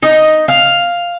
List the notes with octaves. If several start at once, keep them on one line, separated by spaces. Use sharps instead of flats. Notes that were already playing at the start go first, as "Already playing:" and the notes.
D#4
F5